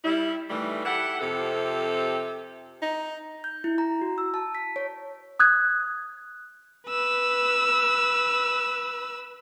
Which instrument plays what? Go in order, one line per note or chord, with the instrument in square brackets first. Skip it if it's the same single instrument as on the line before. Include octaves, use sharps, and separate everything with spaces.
[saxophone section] G3 E4
D#3 E3 G3 A3
E4 G4 A4 F#5
F2 C3 C4 G4 A4
[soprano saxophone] D#4
[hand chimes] G6
E4
A#5
F#4
E6
A5
B6
C#5
[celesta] D#6 F#6 G#6
[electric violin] B4 E6